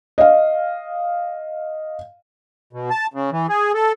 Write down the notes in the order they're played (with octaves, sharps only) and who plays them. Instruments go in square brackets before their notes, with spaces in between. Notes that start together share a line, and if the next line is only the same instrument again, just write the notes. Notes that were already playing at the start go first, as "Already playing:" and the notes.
[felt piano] D#5 F5
[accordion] B2
A5
C#3
E3
G#4
A4